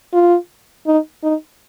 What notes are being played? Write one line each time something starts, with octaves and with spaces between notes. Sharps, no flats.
F4
D#4
D#4